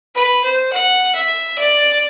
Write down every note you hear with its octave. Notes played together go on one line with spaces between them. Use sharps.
B4
C5
F#5
E5
D5